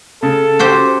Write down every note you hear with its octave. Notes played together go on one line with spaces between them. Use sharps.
C#3 A4
F#4 G4 C5